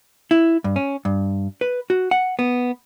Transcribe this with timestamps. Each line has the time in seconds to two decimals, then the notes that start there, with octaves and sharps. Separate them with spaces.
0.31 E4
0.64 G2
0.76 C#4
1.05 G2
1.61 B4
1.90 F#4
2.11 F#5
2.39 B3